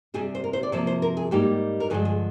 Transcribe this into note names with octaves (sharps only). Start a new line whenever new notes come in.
C3 G3 D4 G#4
C5
A#4
C5
D5
C3 F3 A#3 C5
C5
A#4
G#4
G#2 G3 A#3 D#4 G4
A#4
G2 D3 F3 G#3 G#4
G#4